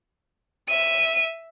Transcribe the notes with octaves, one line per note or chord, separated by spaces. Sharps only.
E5 D#7